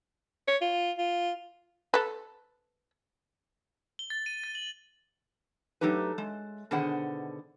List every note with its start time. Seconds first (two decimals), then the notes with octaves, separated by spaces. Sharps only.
0.48 C#5
0.61 F4
0.98 F4
1.94 A4 B4
3.99 G7
4.10 A6
4.26 D#7
4.44 A6
4.55 F#7
5.81 F#3 A3 D#4 G4 B4
6.18 G#3
6.71 B2 D3 D#3 G#4 C5 F#5